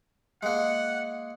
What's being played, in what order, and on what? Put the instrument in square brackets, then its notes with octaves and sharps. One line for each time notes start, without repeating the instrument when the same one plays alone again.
[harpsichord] G#3 A#3 [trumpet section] F#5